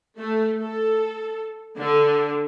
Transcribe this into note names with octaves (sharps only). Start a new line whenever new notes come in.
A3
A4
D3